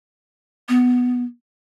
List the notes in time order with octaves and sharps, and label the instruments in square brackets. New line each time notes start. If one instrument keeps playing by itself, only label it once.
[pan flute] B3